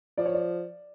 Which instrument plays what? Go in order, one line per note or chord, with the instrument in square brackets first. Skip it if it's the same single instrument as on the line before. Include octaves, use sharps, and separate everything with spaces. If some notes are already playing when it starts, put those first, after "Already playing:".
[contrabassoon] F3 [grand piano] D5
[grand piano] C#5
D5